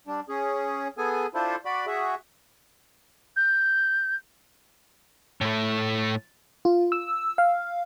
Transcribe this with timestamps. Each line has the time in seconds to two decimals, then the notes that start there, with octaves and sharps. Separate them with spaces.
0.07 G3 D4
0.29 C#4 G#4
0.98 B3 G#4 A4 G#5
1.35 D4 E4 F4 A4 C5
1.65 F#4 D5 B5
1.87 F#4 G#4 E5
3.36 G6
5.41 A2 A3
6.65 F4
6.92 E6
7.38 F5